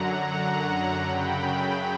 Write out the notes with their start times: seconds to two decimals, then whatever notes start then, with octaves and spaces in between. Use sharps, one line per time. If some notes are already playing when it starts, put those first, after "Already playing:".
Already playing: F#2 D3 F#3 F#5 A#5
0.25 F#5 A#5
1.03 F#2 C#3 F#3 G5 B5